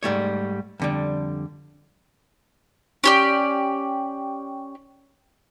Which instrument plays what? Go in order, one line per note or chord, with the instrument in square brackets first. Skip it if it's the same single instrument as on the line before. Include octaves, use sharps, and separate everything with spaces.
[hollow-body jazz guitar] G#2 G3 A3 C#5
F2 D3 G3
[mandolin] C#4 G4 D5